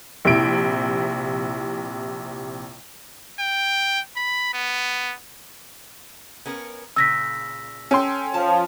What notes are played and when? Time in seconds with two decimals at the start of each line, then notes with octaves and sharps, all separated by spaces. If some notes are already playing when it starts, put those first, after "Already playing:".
0.25 A#1 C3 E4 D7
3.39 G5
4.16 B5
4.54 B3
6.46 B3 C#4 A#4
6.96 A#2 C#3 E6 A#6 B6
7.91 C#4 A4 G5 C6
8.34 F3 A5